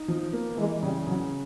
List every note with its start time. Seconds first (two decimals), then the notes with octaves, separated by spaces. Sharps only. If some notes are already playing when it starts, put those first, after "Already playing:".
Already playing: D#4
0.08 F3
0.33 A#3
0.57 E3 G#3
0.82 C#3 G3
1.06 C#3 F#3